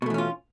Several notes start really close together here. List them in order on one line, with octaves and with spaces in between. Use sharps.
B2 A3 E3 C#4 F4